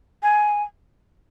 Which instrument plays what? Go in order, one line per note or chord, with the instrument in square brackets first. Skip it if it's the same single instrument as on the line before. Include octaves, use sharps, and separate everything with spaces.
[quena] G#5